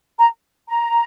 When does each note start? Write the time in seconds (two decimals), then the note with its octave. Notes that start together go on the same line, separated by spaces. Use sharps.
0.18 A#5
0.68 A#5